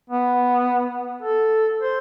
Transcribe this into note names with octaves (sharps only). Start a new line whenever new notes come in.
B3
A4
C5